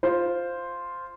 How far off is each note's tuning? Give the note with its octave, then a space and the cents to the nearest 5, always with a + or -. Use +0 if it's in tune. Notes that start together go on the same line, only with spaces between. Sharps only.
F4 +0 C5 +0